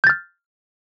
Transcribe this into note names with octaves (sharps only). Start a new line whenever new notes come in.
F6 G6 A6